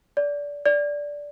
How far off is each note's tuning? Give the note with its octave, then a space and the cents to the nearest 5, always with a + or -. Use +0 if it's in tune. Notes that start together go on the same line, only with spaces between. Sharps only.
D5 -20
D5 -10